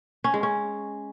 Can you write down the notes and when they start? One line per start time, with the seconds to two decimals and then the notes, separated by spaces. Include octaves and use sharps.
0.24 C#4
0.34 G#3
0.43 C#4